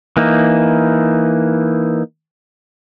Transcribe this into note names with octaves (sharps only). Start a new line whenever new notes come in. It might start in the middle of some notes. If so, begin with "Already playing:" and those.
E3 A#3 D#4